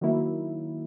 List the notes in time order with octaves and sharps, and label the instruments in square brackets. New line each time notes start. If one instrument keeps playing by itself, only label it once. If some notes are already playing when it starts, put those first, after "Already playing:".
[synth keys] D#3 F#3 A#3 E4